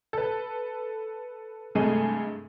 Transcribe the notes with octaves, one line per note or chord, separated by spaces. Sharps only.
A4 B4
G2 C3 G#3 A3 G#4 D#7